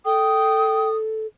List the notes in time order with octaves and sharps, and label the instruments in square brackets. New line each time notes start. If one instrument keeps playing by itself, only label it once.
[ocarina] A4 [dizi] G5 [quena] D#6